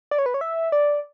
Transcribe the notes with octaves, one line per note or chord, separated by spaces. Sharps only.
D5
C#5
B4
C#5
E5
D5